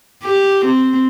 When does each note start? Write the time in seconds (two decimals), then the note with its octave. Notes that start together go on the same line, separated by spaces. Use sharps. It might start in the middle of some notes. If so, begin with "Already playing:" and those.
0.23 G4
0.66 C4